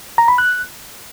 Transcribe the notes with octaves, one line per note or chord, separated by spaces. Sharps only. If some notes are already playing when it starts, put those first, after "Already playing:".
A#5
B5
F#6